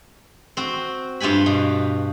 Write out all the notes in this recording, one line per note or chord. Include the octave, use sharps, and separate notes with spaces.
C4 F#4
G2 F4 G4 G#5 B5
B2